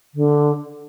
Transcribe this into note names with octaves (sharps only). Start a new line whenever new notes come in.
D3